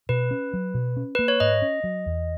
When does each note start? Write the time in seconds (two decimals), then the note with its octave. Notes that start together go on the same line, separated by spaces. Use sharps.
0.09 B2 B4
0.31 C#4
0.53 F#3
0.74 B2
0.97 C#4
1.15 A#3 B4
1.28 C#5
1.40 G#2 D#5
1.62 C#4
1.84 F#3
2.06 E2